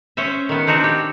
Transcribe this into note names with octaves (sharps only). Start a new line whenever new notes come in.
C#4 C5 E5
D#3 B3
C4 D4 D#4 F#4
G4